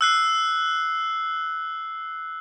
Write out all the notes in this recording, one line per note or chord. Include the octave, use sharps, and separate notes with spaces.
E6 F#6 C7